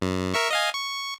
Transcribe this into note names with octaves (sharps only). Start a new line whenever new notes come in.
F#2
A#4 E5 C#6
D#5 F5 G#5
C#6